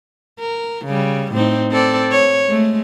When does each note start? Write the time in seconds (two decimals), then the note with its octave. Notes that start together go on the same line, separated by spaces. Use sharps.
0.40 A#4
0.86 C#3 G3
1.33 A2 C4 D#4
1.71 C4 A4 D5
2.12 C#5
2.46 G#3 A3